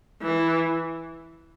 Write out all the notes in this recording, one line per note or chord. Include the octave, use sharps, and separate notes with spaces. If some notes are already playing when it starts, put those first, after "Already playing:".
E3